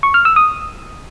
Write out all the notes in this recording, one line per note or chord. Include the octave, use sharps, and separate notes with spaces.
C#6
F6
E6
D#6